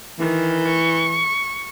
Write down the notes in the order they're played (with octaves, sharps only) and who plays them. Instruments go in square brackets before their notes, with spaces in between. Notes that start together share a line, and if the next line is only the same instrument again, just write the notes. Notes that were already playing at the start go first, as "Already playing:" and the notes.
[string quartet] D#3 [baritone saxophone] E3
[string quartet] C#6